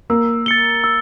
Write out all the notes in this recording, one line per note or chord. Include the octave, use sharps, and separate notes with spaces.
A#3 E6
A6 C#7 G7
E6